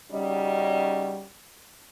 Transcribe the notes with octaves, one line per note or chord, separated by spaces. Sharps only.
C#3 G3 C#4 D#4 F#4 D#5